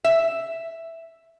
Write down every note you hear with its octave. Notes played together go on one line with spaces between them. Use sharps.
E5